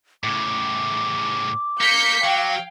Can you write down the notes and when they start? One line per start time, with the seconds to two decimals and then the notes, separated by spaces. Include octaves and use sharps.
0.24 A2 C#3 D6
1.81 A#3 G6 B6 C#7
2.24 F#3 F5 G5